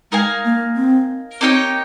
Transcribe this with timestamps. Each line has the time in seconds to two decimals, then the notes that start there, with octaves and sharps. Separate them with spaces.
0.12 G#3 D#4 A#4 F5 G#5
0.45 A#3
0.76 C4
1.41 A#3 C4 D#4 G4 C#5